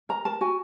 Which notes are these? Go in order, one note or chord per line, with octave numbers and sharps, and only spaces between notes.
A#4 A#5
A#4 A5
F#4 G#5